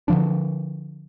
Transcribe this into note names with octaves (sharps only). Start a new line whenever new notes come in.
D3 F3 D4